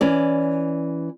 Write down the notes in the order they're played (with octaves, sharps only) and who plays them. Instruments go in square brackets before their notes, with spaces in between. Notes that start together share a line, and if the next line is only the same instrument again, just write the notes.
[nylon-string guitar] E3 C#4 D5